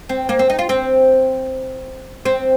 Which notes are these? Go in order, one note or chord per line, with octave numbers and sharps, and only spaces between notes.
C4
A#3
C4
D#4
F4
C4
C4